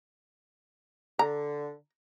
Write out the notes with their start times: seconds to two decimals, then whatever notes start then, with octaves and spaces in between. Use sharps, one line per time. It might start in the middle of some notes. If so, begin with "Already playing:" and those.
1.19 D3 A#5